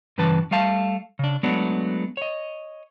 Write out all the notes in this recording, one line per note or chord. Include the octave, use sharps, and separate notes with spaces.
G2 C#3 E3 B4 A5
G3 A3 F5 A5
C#3 D4
F#3 G#3 A3 B3 D4
C#5 D#5